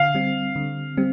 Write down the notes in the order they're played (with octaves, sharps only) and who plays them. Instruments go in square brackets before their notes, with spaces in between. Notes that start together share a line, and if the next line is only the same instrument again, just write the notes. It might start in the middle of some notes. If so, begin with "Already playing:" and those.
Already playing: [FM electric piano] D3 [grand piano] F5
[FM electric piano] G3 C4
D3
G3 C4